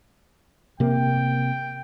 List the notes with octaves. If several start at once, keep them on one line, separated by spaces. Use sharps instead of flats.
C3 A#3 G5